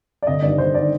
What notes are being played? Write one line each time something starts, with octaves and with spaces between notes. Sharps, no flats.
D5
G1 D#5
G2 D#3 D5
G1 C5
D#3 D5